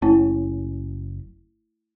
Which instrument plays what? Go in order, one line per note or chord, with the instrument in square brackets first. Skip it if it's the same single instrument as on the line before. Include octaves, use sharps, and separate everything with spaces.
[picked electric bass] F#1 C#4 [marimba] A3 E4 A5